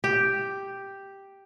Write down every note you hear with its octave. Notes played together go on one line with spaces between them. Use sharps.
G4